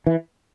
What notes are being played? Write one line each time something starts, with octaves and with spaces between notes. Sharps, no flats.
E3